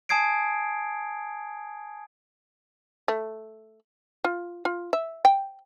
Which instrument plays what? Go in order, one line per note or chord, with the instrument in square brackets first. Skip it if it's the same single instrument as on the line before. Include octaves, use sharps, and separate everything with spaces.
[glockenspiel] G#5 A5 D#6 G#6 C7 D7
[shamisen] A3
F4
F4
E5
G5